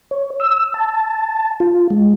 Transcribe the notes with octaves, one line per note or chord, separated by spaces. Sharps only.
C#5
E6
A5
F4
G#3